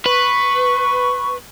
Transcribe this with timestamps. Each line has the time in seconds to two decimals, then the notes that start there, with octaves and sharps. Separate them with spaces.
0.06 B4 C#6